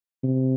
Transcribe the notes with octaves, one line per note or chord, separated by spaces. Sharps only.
C3